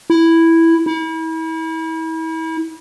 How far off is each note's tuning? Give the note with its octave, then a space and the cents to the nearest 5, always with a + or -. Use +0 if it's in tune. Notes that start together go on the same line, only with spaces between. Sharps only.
E4 +0
E4 -35